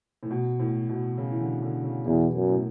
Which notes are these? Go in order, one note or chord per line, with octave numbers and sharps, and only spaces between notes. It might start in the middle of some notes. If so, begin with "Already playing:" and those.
A2
B2
A2
B2
C#3
E3
D3
D3
C#3
E2 B2
F#2
A2